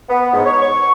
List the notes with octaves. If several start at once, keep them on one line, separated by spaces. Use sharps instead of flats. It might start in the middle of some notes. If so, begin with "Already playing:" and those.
B3
G#2
C#5
C#6